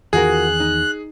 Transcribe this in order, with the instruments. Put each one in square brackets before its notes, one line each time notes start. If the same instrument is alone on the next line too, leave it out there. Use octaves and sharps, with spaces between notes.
[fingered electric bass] E2 D#3 [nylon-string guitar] F4 F#4 A#4 [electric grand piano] G#4 [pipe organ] F#6
[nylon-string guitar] D#4